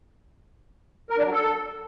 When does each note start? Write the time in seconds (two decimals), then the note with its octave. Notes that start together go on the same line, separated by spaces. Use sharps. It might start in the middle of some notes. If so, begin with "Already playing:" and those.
1.10 A#4
1.17 D4
1.25 F#3
1.32 A4